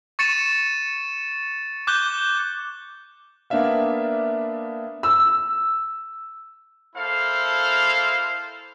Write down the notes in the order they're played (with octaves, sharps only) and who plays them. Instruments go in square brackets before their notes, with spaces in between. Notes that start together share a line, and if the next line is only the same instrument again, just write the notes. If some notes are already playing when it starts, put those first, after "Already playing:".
[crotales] C#6 A6 C#7 D#7 E7
D6 F#6 G6 G7
[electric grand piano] A#3 B3 D4 D5 E5 F5
[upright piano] E6
[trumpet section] A#3 E4 A4 C5 F5